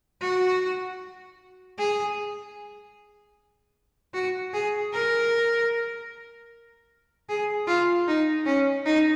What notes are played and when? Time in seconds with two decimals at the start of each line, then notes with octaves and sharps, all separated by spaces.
0.21 F#4
1.78 G#4
4.14 F#4
4.54 G#4
4.93 A#4
7.29 G#4
7.67 F4
8.07 D#4
8.46 C#4
8.86 D#4